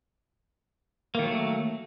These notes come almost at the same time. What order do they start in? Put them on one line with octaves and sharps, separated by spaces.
A#3 D#3 F#3 A3